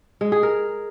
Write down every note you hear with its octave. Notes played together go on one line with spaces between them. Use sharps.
G#3
G#4
A#4